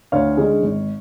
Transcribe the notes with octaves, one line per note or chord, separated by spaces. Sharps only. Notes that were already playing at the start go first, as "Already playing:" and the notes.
D2 C#5 F5
D3 G#3 C#4
G#1